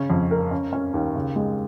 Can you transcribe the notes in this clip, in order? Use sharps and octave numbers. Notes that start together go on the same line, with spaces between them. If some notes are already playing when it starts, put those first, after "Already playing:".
Already playing: C#3 C#4
F2
A#4
C#4
C#4
D#2
C#3
G#3